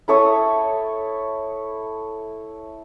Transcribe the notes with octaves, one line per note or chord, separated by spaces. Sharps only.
E4 A4 C#5 D#6